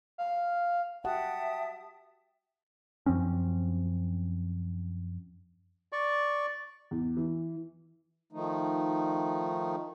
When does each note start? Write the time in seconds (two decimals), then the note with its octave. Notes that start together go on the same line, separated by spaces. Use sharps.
0.18 F5
1.04 F#4 G4 E5 F#5 G5 A5 D#6
3.06 F#2 F3 C4 C#4
5.92 D5 C#6
6.91 E2
7.17 E3
8.33 D#3 F3 A3 D#4